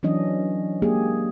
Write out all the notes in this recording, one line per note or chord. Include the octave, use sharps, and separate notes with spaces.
E3 F#3 C#4 D4 D#5
G#3 A#3 G4 G#4